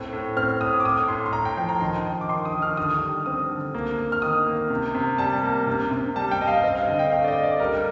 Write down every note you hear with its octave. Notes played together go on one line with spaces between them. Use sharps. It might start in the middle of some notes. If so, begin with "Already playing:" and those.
Already playing: A2 C4
A2
C4 F6
A2 D#6
D6
A2 D#6
A2 C6
C6
A2 A#5
G5
F3 G5
A#5
D#3 C6
D#3
D6
D#3 C6
D#6
D#3
F6
D3 D#6
D#6
G3
C4 D#6
D3
A#3
A#3
F6
D#3 D#6
A#3
C3
C3
G3 A5
A#3
C3
C3
G3 A5
G5
G3 D#5
F5
C4 D#5
F5
D3 D#5
G5
A3 F5
D5
D#5
A3
D5
G3 A#4